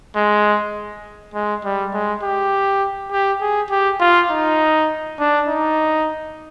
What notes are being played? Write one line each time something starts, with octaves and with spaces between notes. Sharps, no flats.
G#3
G#3
G3
G#3
G4
G4
G#4
G4
F4
D#4
D4
D#4